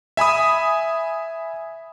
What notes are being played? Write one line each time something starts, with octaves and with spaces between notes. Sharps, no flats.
E5 G#5 B5 D#6